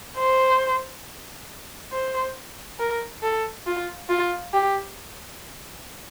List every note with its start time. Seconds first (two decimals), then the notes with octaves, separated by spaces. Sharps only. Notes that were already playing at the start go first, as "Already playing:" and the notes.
0.18 C5
1.92 C5
2.79 A#4
3.22 A4
3.66 F4
4.09 F4
4.53 G4